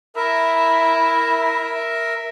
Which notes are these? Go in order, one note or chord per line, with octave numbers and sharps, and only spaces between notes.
E4 A#4 E5